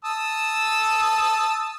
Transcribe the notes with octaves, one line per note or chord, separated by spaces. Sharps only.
A5 D#6 E6